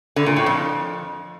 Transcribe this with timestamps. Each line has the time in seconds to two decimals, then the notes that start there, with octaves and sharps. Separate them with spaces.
0.16 D3
0.26 A#2
0.36 A2
0.46 F2